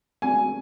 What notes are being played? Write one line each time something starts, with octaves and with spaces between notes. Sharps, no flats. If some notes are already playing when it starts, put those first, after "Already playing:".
G#5